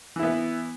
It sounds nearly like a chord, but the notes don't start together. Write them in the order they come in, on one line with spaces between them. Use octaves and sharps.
E3 E4 B3